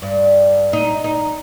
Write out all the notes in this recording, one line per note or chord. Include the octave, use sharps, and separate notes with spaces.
G2
D#4
D#4